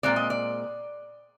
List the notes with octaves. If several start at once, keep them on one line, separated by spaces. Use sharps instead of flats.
A#2 G#3 C4 D5
D#5
D5